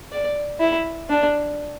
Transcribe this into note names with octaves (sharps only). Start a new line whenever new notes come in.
D5
E4
D4